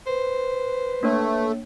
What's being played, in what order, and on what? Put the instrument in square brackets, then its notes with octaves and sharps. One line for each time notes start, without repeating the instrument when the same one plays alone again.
[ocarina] B4 [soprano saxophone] C5
[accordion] A3 [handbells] A#3 D4 C#5